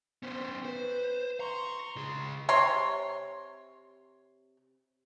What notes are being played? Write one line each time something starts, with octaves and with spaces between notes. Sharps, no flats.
B3 C#4 C5
B4 C5
A#5 C6 C#6
C#2 G#4
C3 C#5 C6